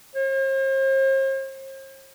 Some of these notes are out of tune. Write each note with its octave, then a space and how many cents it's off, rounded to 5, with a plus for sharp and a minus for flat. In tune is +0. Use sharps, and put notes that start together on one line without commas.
C5 +45